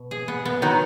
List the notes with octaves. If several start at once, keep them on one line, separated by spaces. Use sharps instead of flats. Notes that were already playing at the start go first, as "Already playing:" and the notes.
Already playing: B2
G#4
B3
B3
D#3 F#3 B3